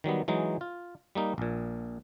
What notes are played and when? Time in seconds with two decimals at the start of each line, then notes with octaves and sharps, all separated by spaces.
0.04 D#3 F#3 G3 B3
0.28 E3 F#3 G#3 D#4
0.61 F4
1.15 G3 A#3 D#4
1.38 A#1 A#2